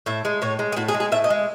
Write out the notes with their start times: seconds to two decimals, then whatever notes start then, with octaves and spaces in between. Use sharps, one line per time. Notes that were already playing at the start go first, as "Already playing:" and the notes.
0.06 A2 E5
0.25 G#3
0.42 A2 C#5
0.59 G#3
0.72 G#4
0.76 A2 F#4
0.88 G#4
0.94 G#3
1.00 G#4
1.12 A2 E5
1.24 D#5
1.30 G#3